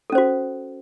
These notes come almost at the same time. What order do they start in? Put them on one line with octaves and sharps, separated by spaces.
A4 C#4 C5 F#4